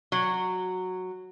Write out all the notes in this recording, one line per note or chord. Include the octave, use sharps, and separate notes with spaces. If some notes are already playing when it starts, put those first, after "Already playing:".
F#3